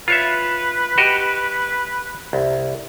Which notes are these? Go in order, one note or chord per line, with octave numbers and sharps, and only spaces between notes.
F4 B4 C#5 E5
F#4 G4 D#5
C2